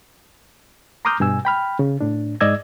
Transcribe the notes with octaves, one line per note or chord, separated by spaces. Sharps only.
A#5 C6 D6 D#6 F6 G6
G2 B2 G#5 E6
G5 B5 F6
C#3
A2 D4
G#2 G#3 D5 D#5 E6 G#6